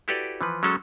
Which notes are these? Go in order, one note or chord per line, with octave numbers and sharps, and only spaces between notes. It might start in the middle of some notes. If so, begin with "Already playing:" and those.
E4 F#4 G4 A4 B4 D5
E3 F3 B4
F#3 G#3 C#4 A4